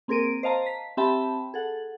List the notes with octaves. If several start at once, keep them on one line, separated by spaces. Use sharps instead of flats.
A#3 C4 G#4 A#4 D7 D#7
C5 D#5 F5 A5 A#5
B6
C4 G4 E5 G5 A5 B5
G#4 A4 F#5